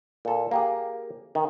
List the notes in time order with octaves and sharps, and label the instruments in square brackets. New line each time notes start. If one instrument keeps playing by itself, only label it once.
[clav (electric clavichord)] A#2 A4
A#3 G4 G#4
D#3